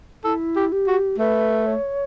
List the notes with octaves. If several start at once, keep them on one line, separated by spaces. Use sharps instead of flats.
E4 A4
G4
G4
F#4
A3 B4
C#5